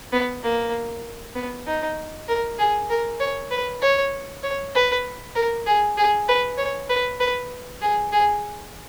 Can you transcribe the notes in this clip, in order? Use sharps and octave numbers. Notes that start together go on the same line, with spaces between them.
B3
A#3
B3
D#4
A#4
G#4
A#4
C#5
B4
C#5
C#5
B4
A#4
G#4
G#4
B4
C#5
B4
B4
G#4
G#4